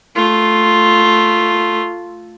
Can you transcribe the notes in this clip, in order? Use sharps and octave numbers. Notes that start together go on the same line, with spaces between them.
A3 F4